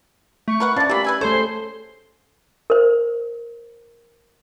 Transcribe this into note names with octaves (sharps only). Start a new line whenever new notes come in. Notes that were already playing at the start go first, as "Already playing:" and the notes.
A3 C#6
A#4 B4 F#5
F3 C#4 D4 D5 A6
E3 A#3 G4 B5
B4 E5 G#5 G#6
A3 G#4 A4 C5 C#5 C6
A#4 C5